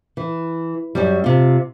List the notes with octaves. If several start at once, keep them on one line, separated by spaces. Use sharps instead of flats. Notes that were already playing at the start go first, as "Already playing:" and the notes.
E3
F#2 F#3 G3
C3 F4